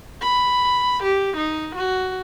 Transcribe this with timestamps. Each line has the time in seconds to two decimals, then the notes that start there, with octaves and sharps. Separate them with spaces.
0.22 B5
1.03 G4
1.37 D#4
1.75 F#4